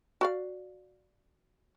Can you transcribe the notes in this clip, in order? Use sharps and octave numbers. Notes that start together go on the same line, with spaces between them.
F#4 D5 F5